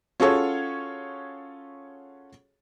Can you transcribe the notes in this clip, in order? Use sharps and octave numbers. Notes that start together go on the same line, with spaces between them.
C#4 F4 F#4 G#4 A4 C#5